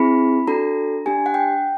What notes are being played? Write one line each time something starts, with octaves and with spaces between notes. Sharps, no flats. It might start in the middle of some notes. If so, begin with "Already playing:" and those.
Already playing: C4 E4 G#4 B5
D4 F#4 A4 A#5
D4 G4 G#5
F#5
G5